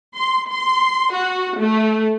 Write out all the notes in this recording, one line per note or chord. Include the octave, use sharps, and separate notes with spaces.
C6
C6
F#4
A3